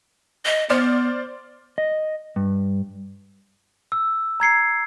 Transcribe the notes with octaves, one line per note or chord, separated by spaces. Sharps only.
D#5
B3 C5 D5 F6
D#5
G2
E6
A#5 G#6 C7 C#7